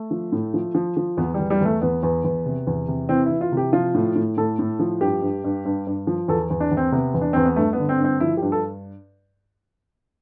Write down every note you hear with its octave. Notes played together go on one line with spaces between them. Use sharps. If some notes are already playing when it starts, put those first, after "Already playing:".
Already playing: A3
F3
A2
F3
F3
F3
E2 B3
E2 G3
G3
E2 A3
E2 B3
E2
E2
C3
E2
C3
E3 C4
E3 E4
F4
C3
G4
F3 F4
A2
A2
A2 A4
A2
F3
G2 G4
G2
G2
G2
G2
F3
E2 A4
E2
D4
E2
C4
C3 B3
E2
D4
E2 C4
B3
G2 A3
B3
D3
C4
G2
C4
F3 E4
G4
G2
A4